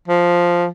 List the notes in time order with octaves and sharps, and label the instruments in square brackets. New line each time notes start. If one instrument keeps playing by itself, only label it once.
[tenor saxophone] F3